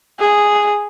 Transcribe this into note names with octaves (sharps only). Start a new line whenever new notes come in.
G#4